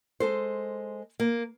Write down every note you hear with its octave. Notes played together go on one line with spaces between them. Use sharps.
G#3 A4 C5
A#3